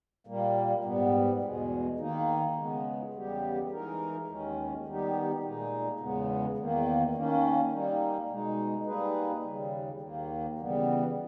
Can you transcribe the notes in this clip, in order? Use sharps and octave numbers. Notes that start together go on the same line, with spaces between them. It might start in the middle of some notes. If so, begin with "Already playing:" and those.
A#2 G3 A#3
G#2 G3 B3
E2 B2 G#3
D#3 A#3 D#4
C#3 G#3 B3
E2 C#3 G3 B3 G4
E3 G#3 D#4 A#4
D#2 D#3 G#3 C#4
D#3 G3 B3 D#4 G4
A#2 G#3 D#4
E2 C#3 G#3 B3
E2 D#3 A#3
D#3 A#3 C#4
G3 A#3 D#4
B2 G#3 D#4
G3 A#3 D#4 G#4 B4
D#2 C#3 G3
D#2 D#3 A#3
C#3 E3 G3 B3